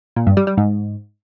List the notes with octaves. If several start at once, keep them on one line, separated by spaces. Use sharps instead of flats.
A#2
G2
G3
G3
G#2